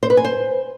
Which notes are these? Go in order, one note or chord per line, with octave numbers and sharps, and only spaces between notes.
C5
B4
G#5
C5